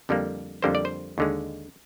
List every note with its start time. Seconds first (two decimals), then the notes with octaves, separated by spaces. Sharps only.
0.09 F2 D3 G3 A#3
0.62 F2 D3 G3 A#3 C5
0.75 D5
0.85 C5
1.18 D#2 D3 G#3